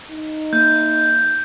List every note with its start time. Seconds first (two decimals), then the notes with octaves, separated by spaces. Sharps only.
0.11 D#4
0.53 A#3 G6